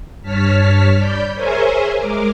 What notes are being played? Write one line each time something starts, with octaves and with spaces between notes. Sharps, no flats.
G2 C#5 A5 F6 B6
D5 B5 G6
G#4 A#4 C5 C#5 E5 G#5
G#3 A#4 D6